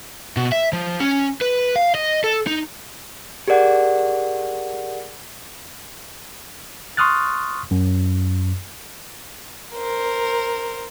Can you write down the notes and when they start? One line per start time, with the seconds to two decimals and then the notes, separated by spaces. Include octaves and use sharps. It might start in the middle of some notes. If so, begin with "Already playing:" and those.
0.37 B2
0.52 E5
0.73 F3
1.00 C#4
1.42 B4
1.76 F5
1.94 D#5
2.24 A4
2.47 D#4
3.48 G4 G#4 A#4 D5 F#5
6.97 C6 C#6 D#6 F6 F#6 A6
7.71 F#2
9.75 A#4 C5